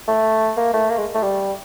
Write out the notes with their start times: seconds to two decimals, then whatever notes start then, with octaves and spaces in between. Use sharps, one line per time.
0.08 A3
0.57 A#3
0.74 A3
0.90 A#3
0.98 G#3
1.14 A3
1.23 G3